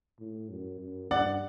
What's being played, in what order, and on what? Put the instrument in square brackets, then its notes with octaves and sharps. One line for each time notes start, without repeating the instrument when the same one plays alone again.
[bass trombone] A2
F#2
F#2
[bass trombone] G2 [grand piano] D5 F#5